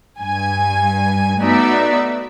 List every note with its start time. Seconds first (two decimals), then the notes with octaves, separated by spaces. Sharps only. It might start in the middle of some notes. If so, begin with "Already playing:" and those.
0.18 G2 G#5
1.39 A3 B3 D#4 F#4 D5 E5